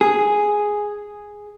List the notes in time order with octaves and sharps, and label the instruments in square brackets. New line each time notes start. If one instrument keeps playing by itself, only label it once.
[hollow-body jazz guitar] G#4